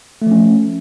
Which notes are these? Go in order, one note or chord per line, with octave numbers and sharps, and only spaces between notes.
F3 A3 C#4